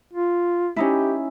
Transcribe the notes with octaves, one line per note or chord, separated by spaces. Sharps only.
F4
C#4 D#4 E4 G4